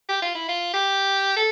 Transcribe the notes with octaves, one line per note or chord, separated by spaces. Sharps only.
G4
F4
E4
F4
G4
A4